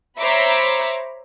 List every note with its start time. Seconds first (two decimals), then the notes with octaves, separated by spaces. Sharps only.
0.19 C5 C#5 E5 A#5 B5 D6